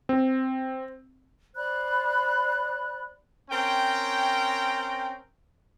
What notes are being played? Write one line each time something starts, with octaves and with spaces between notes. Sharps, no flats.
C4
C5 D5 B5 F#6
C4 C#4 A#4 G5